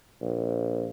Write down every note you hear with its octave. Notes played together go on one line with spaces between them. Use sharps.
A#1